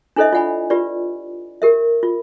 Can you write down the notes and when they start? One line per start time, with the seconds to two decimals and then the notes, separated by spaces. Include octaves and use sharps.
0.16 D4 E4 A4 C5 D#5 E5
0.33 F4 D5 F#5 G#5 B5
0.70 F4 G4 B4 D5
1.62 G4 A#4 E5
2.03 F4